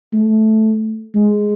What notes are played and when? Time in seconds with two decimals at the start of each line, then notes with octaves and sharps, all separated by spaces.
0.13 A3
1.15 G#3